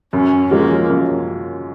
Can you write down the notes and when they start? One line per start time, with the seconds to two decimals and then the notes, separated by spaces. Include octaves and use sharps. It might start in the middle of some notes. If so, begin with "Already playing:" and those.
0.13 F#2 C#4
0.51 F3 G#3 A#3 C#4
0.89 F#2